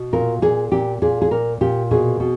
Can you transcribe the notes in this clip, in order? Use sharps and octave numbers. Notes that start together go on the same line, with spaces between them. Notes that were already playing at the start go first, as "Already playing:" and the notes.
Already playing: B2
A#2 A#4
A#2 G#4
A#2 G4
A#2 G#4
G#4
A#2 A#4
A#2 G4
B2 G#4
B2